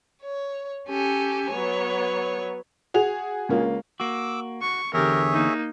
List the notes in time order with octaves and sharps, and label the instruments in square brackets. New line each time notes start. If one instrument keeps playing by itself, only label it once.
[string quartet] C#5
C#4 G4 A4 G#5
F#3 B3 C#5
[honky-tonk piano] F#4 G#4 F7
[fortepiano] C#2 A#3 F4
[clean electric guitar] A#3 F#4 [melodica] D6 E6
[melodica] F#4 [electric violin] C#6
[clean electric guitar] E2 D3 [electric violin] G4 A#4 [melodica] G#4 C#5 E5
[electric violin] A#3 D#4